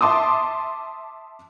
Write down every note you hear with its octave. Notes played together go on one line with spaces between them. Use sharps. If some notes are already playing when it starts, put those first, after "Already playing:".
E5 A5 C6 D6 D#6